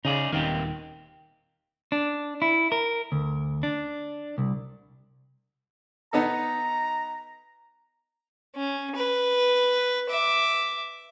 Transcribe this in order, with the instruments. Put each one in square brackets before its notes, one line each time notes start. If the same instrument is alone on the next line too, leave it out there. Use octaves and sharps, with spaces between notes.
[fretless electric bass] C#3 [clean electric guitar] D#4 G#4 D5
[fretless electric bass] D#1 D#3 [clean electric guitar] A#3 C4 G4
[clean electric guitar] D4
E4
A#4
D2
D4
C2
[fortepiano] B3 D#4 A4 [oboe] A#5
[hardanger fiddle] C#4
B4
E5 D6